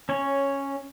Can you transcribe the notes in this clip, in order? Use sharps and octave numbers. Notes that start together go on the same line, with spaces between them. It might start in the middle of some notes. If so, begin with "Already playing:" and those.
C#4 C#5